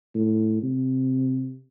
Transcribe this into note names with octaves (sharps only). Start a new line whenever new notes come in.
A2
C3